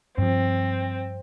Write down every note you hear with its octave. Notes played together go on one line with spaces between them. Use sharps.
G2 F3 C4